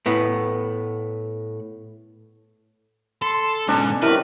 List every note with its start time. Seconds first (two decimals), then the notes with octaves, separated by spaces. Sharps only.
0.06 A2 B3
3.22 A4 C6
3.68 G#2 B2 C#4 D4 C#6
4.03 C3 D#3 F#3 E4 A#4 B4